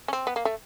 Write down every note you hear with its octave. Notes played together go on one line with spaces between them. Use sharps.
C#4
C4
B3
A#3
A3